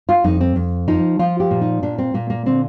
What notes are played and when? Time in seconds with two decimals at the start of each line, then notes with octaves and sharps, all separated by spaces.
0.09 F4
0.24 F2 D#4
0.41 C4
0.56 F2
0.88 F3 D#4
1.19 F3 F4
1.40 G4
1.51 A#2
1.61 D#4
1.83 A#2 D4
1.98 C4
2.14 A#2 A#3
2.30 A#3
2.46 D3 C4